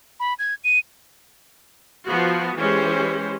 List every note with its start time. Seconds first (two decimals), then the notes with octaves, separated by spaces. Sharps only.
0.20 B5
0.39 G#6
0.64 D#7
2.05 F3 B3 F#4
2.56 E3 G#3 C#4 G4 C5